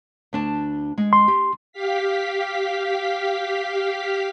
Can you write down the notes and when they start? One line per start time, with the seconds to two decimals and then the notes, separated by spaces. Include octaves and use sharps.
0.33 D2 D4 A5
0.98 G#3
1.13 C6
1.28 G4
1.72 G4 F5 B6